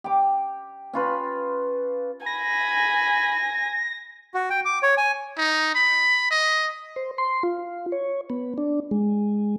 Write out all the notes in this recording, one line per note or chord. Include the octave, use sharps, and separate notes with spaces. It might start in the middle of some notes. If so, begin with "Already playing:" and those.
G4 D6
C#4 F4 B4
G#5 B5 A#6
F#4
G5
D6
C#5
G#5
D#4
B5
D#5
C5
C6
F4
C#5
B3
D4
G#3